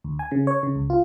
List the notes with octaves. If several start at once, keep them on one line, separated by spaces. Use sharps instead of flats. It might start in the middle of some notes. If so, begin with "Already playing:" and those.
D2
G#5
C#3
C#5
C#3
C#2
F4